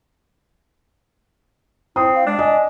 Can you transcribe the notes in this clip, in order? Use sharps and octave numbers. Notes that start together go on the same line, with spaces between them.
C4 E4 D#6
F5
G#3 D4
D#5 G#5